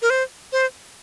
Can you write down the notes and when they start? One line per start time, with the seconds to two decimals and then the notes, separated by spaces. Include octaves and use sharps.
0.02 A#4
0.10 C5
0.52 C5